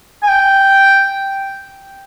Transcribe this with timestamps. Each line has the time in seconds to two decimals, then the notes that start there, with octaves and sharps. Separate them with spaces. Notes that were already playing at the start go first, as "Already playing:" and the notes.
0.23 G#5
0.29 G5